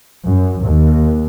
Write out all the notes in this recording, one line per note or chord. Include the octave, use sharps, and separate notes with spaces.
F#2
D#2